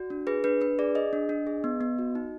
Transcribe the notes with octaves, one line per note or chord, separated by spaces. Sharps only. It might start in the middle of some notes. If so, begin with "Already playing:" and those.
Already playing: F#4 D5
D4
G#4 B4
D4 B4
D4 B4
G#4 D5
G#4 D#5
D4
D4
G#4
B3
B3
F#4
D#4